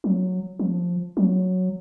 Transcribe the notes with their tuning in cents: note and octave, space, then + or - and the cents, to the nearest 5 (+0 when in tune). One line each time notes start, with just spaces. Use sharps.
F#3 -10
F3 +10
F#3 -5